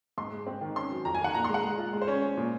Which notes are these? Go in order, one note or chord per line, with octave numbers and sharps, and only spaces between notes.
G#2 C6
G#3
C4
D#3
C#4 C6
F#3
F2 A#5
G#5
D#3 F#5
A#2 A#5
G#3 C6
F#5
G#3
F4
G#3
C5
C#4 C#5
C#4
A#2